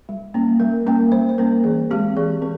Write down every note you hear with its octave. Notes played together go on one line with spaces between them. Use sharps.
G3
A#3 C#4
G3 A#4
A#3 C#4 A#4
G3 C5
C5
A#3 C#4 A#4
E3 G#4
G#3 C4 G4
E3 G#4
C4 A#4